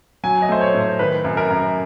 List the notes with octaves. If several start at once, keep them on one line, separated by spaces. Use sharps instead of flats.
F#3 G#5
D#5
A3 C5
C#5
A2
C5
D#3 B4
F#2
A#4
F#2